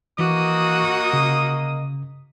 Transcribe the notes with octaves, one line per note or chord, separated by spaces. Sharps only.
E3 A#3 F#4 D#5 D6 D#6
C#3